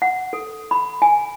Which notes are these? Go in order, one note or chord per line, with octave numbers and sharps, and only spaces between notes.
F#5
A4
B5
G#5